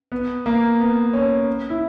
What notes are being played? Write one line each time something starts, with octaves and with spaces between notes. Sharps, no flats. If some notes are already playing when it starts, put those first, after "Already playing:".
B3
A#3
B3
C#4
E4